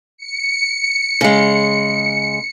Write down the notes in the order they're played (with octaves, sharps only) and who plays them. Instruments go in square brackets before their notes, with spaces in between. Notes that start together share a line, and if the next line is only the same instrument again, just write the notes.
[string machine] C#7
[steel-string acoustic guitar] C#3 G#3